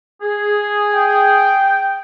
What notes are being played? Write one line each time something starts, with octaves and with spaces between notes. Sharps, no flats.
G#4
G5